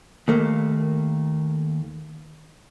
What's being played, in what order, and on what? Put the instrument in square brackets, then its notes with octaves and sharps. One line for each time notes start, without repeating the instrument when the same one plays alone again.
[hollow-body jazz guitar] D#2 A3 A#3